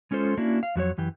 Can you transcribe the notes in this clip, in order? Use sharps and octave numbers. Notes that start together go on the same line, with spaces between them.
G#3 C#4 F4 A4 C5
A#3 C#4 D4 E4 F#4
F5
F2 F#3 F#4 C#5
F#2 E3 G4